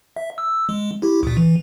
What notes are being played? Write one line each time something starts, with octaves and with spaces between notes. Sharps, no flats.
E5
E6
G#3
E4 G4
D2 A#2
E3